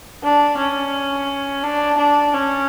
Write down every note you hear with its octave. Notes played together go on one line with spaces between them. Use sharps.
D4
C#4
D4
D4
C#4